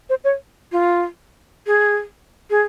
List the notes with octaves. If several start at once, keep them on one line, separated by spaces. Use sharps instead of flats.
C5
C#5
F4
G#4
G#4